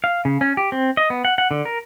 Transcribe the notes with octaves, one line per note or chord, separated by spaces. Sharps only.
F5
C#3
C#4
G4
C4
D#5
B3
F#5
F#5
D3
A#4